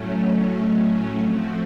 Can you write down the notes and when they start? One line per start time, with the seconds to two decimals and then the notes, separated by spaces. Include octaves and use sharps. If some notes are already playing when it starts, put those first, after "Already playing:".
Already playing: A2 F#3 A3 C#4
1.18 F3 A3 C4 F#4